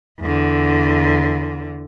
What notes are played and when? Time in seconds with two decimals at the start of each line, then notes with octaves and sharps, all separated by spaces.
0.20 E2 D3